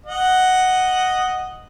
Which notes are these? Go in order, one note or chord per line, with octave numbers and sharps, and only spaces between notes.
D#5 F#5